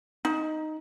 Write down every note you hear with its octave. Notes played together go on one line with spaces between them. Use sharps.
D#4